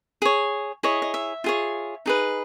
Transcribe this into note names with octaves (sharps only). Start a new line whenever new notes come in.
G#4 C#5
E4 G#4 C#5 D#5
D#5
E5
F4 G#4 C#5
D#4 G#4 B4